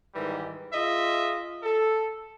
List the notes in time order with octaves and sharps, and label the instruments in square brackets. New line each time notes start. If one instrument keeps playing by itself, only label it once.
[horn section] G#2 D#3 E3 G3
F4 G#4 D#5 E5
A4